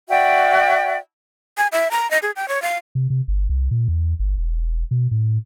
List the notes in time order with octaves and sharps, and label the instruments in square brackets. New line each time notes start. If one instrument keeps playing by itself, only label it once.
[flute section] F#4 D5 E5 G5
[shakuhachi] G#5
E5
A#5
D#5
G#4
G5
C#5
F5
[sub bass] C3
C3
G1
C2
A#2
E2
G1
E1
B2
A2